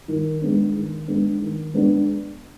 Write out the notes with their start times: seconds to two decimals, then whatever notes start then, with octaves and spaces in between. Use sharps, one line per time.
0.08 D#3
0.41 G#3 B3 D4
0.75 D#3
1.08 G#3 B3 D4
1.41 D#3
1.74 G#3 B3 D4